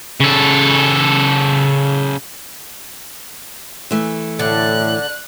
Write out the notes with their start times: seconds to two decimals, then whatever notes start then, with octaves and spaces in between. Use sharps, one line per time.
0.20 C#3 A4
3.91 E3 A3
4.39 A2 D3 D4 F#6